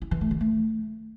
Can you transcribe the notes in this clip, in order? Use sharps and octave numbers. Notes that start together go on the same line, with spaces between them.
E4
E3
A3
D#3
A3